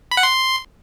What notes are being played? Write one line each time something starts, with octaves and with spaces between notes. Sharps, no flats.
B5
F#5
C6